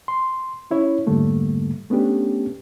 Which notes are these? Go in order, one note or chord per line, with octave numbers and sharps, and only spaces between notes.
C6
C#4 E4 C#5
F2 G#2 D3 G3 A3 A#3
A3 B3 C#4 D4 G4